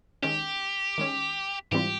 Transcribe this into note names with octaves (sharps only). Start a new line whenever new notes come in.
D#3 G#3 C#4 G4
D#3 G#3 C#4
G#2 E3 G3 C4 F4 G4